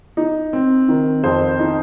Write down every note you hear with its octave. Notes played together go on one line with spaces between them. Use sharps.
D#4
C4
D#3
F2 C5
D#4